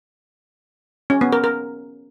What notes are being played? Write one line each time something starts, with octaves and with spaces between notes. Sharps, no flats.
C#4
B3
A#4
A#4